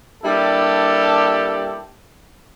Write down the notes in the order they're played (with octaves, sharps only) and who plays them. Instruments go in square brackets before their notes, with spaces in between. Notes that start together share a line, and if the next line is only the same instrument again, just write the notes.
[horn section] G3 A#3 D4 E4 G4 A4